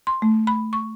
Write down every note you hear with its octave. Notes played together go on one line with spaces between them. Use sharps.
C6
A3
B5
C#6